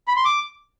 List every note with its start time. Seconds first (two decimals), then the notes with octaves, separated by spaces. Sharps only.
0.08 B5
0.16 C6
0.25 D6